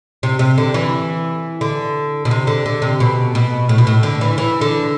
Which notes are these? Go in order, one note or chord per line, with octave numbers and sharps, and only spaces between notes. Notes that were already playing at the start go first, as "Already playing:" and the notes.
C3
C3
D3
E3
D3
B2
C3
D3
D3
C3
B2
B2
A2
B2
A2
D3
E3
E3
D3